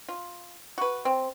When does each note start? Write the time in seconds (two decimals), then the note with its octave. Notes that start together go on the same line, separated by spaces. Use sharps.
0.09 F4
0.78 F#4 B4
1.05 C4